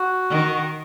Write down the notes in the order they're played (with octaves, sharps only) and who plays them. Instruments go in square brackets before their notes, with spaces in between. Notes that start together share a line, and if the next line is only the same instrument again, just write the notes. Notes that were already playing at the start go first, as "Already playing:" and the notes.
Already playing: [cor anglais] F#4
[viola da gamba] D#3